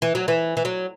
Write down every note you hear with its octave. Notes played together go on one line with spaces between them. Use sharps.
E3
F#3
E3
E3
F#3